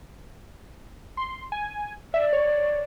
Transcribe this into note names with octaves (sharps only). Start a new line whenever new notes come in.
C6
G#5
D5 E5
C#5